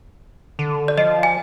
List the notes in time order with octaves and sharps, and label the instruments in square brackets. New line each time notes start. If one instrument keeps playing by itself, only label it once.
[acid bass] D3
[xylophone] D5
[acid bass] F3 [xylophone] D#5
[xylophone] G#5